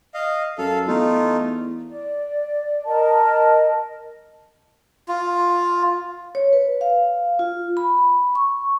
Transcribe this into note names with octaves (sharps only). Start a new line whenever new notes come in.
D#5 F5
F#2 A4 F5
E2 A3 D#4 F4
D5
A#4 D#5 A5
F4
C#5
B4
F5
F4
B5
C#6